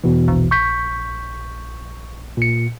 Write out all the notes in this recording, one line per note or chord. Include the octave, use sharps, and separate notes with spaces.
E2 B2 E3
A#1
C#6 G6 B6
A#2 C#7